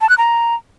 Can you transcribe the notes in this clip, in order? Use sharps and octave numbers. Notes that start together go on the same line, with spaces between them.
A5
F#6
A#5